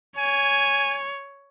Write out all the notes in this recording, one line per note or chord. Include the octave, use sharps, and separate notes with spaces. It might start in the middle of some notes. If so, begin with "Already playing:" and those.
C#5 G#5